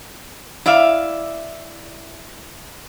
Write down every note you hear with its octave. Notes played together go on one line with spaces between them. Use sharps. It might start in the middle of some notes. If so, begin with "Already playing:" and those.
E4 D5 E5 F5